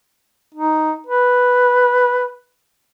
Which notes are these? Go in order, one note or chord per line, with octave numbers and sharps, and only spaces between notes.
D#4
B4